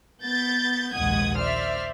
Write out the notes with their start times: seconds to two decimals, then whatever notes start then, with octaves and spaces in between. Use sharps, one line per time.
0.23 B3 G6 A6
0.94 A#1 D#2 G#2 F#5 D#6 G#6
1.39 C5 D5 E5 F6